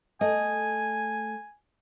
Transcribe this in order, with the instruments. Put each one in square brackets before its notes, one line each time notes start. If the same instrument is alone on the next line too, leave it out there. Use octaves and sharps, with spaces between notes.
[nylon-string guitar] A3 D#5 [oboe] G#5